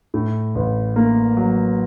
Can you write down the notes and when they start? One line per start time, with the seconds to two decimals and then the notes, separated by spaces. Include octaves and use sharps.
0.14 A2
0.55 A1
0.96 A#3
1.37 F#3